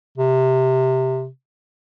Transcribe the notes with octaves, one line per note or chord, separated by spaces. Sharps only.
C3